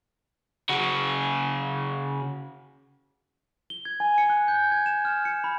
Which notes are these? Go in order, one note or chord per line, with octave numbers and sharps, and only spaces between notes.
C#3 F#4
G7
G#6
G#5
C#7
F#6
G6
G#6
E7
F6
C#7
B5